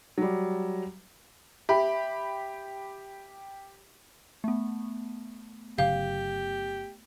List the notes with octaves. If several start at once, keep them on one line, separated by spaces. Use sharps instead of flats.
F#3 G3
G4 E5 B5
A3 B3
G1 C#3 F#3 G4 F5